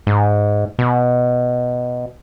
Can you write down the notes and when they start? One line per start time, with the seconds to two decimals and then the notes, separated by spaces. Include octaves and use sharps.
0.07 G#2
0.79 B2